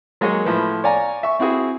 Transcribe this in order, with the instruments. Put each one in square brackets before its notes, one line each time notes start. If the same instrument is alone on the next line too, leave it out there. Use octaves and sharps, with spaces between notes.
[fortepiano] F#3 G#3 A#3 G#4 C#5
A2 F3 B4
C#5 D5 F5 G#5 A#5
E5 C#6
C4 E4 F#4 G#4